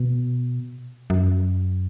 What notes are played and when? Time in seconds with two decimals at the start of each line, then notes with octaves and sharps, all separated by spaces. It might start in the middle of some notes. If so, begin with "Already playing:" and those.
Already playing: B2
1.10 F#2